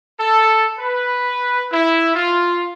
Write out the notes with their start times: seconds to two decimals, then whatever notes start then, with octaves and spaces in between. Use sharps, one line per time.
0.20 A4
0.78 B4
1.71 E4
2.15 F4